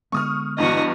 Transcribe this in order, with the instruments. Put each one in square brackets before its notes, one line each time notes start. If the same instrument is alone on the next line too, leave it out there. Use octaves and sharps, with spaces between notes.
[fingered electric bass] D3 G#3 B3 [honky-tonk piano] C#6 D#6 F6
[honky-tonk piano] E2 G2 [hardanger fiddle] F#4 D#5